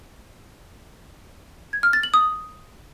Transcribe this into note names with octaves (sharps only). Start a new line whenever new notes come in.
G#6
F6
A6
F#7
D#6